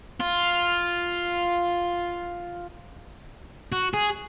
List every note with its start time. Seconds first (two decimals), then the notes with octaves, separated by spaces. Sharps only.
0.20 F4
3.72 F#4
3.94 G#4